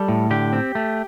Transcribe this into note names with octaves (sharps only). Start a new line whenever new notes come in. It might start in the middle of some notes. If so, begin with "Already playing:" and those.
Already playing: G3 A4
A2
D3 G4
C4
A3